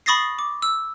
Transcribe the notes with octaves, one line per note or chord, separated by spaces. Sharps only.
B5 C#6 D#6 A6 A#6 C7
D6
E6